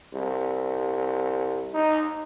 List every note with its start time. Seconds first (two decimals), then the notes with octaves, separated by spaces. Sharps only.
0.14 C2
1.74 D#4